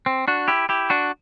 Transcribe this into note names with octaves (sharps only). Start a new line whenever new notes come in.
C4
D4 F#4
E4 G4
E4 G4
D4 F#4